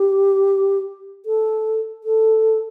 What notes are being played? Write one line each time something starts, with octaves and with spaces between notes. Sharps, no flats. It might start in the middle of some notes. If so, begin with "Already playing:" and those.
Already playing: G4
A4
A4